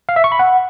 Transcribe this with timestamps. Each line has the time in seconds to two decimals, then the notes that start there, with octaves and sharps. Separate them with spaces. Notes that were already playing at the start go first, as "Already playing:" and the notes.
0.09 F5
0.16 E5
0.24 C#6
0.32 B5
0.39 F#5